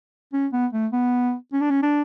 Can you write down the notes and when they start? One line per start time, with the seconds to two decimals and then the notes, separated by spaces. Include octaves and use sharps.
0.33 C#4
0.53 B3
0.73 A3
0.92 B3
1.53 C#4
1.61 D4
1.70 C#4
1.83 D4